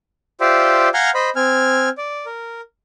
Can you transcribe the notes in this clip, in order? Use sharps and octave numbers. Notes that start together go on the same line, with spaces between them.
F4 G4 C5 D5 E5
F5 F#5 G#5 A#5 F6 G6
C5 D#5 B5
C4 G#5 F6
D5
A#4